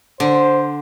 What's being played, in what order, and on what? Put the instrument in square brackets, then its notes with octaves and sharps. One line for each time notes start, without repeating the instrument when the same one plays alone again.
[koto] D3 [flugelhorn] C5